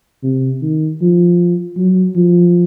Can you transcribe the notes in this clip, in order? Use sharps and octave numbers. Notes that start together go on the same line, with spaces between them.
C3
D#3
F3
F#3
F3